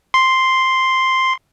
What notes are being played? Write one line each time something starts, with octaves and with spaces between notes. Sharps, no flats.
C6